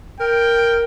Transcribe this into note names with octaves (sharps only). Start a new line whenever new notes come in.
A#4 G5